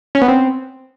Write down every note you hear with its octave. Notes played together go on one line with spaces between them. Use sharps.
C#4
B3
C4